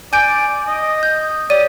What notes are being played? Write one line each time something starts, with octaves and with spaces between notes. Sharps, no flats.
D5 G#5 G6 D7
D#5
G6
G4 C#5 D5 D#7